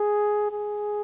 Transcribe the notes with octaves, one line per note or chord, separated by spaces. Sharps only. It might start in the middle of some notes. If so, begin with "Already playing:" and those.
Already playing: G#4
G#4